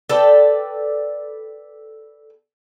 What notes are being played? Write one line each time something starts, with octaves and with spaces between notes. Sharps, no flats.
A4 B4 D5 G5